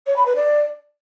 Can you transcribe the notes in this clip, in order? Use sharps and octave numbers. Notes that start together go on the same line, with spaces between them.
C#5
B5
B4
D5